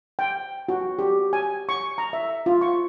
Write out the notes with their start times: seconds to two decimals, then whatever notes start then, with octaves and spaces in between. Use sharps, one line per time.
0.19 G5
0.69 F#4
0.99 G4
1.33 G#5
1.69 C#6
1.98 A#5
2.13 E5
2.46 F4
2.61 C#6